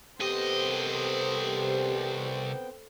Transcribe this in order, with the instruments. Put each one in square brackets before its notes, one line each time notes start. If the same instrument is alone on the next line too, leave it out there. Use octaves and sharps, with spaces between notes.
[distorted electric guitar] C2 D#5 [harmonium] B3 C4 G5 [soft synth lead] G4 [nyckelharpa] A4 C5